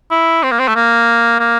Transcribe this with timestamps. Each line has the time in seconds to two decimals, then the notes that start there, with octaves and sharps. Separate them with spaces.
0.11 E4
0.43 C4
0.51 A#3
0.59 C4
0.68 A3
0.76 A#3
1.39 A#3